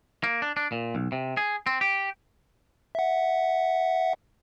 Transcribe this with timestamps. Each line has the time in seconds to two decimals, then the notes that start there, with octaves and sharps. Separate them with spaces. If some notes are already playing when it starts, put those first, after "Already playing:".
0.24 A#3
0.42 D4
0.57 D4
0.72 A#2
0.95 B1
1.12 C3
1.37 G#4
1.67 C4
1.81 G4
2.95 E5 F#5